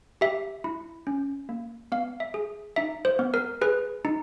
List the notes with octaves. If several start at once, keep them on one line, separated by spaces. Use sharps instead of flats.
G4 E5
E4
C#4
A#3
B3 F5
E5
G#4
D#4 E5
C5
B3
A#4
G#4 B4
D#4